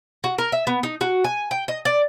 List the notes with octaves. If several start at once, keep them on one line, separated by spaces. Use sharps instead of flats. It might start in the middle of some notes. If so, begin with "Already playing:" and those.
F#4
A#4
E5
B3
D#4
F#4
G#5
G5
D#5
D5